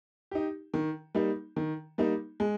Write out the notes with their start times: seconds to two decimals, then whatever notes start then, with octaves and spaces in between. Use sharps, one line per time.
0.31 D#4 G4
0.74 D#3
1.15 G3 A#3 D#4
1.56 D#3
1.98 G3 A#3 D#4
2.40 G#3